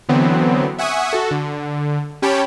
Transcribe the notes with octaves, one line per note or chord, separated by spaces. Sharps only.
D3 E3 F#3 B3 C4
E5 F#5 G#5 C#6 D#6
F#4 A4
D3
C#4 G4 C#5 G5 A5 B5